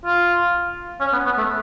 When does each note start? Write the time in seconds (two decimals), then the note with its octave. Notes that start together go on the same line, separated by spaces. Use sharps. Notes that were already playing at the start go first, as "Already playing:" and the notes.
0.05 F4
1.00 C#4
1.13 B3
1.26 B3
1.38 A3